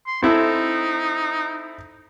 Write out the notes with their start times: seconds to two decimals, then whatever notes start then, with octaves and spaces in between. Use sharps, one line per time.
0.07 C6
0.23 C4 D#4 E4 A4